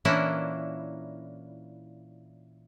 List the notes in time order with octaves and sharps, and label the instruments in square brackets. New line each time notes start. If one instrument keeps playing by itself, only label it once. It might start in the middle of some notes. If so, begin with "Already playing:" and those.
[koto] A#2 E3 A#3 C#4 D4 E4